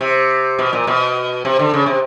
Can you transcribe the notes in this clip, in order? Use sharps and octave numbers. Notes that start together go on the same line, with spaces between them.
C3
B2
A#2
B2
C3
D3
C#3
C3